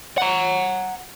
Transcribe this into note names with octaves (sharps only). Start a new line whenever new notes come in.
F#5 A#5